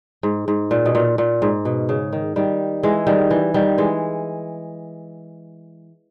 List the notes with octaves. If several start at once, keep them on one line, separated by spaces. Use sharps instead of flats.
G#2
G#2
A#2
B2
A#2
A#2
G#2
B2
C#3
D#3
D#3 G3
E3 G#3
D#3 G3
E3
D#3 G3
E3 G#3